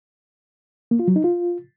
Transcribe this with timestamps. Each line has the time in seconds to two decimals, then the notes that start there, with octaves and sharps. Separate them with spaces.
0.91 A#3
0.99 F4
1.08 F#3
1.16 D#4
1.24 F4